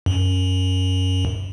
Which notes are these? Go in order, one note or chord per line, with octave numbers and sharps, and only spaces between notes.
F#2